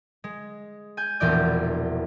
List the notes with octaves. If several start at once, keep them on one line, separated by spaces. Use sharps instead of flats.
G#3
G#5 G6
E1 A#1 E2 D5 G6